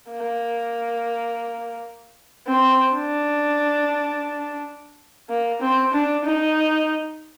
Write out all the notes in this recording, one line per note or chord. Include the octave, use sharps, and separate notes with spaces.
A#3
C4
D4
A#3
C4
D4
D#4